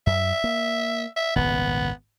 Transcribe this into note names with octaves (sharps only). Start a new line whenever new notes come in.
F#2 E5
A#3
E5
D#1 G#1 C#2 B3